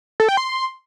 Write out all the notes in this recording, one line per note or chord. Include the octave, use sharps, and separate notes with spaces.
A4
G5
C6